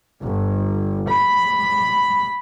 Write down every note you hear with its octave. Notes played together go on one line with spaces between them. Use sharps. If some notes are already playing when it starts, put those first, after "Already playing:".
G1
B5